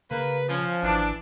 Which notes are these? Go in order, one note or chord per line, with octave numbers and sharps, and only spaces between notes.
C#3 A#3 B4
F3 C#4
G#1 E3 D4